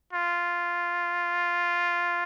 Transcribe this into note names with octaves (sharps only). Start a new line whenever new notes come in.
F4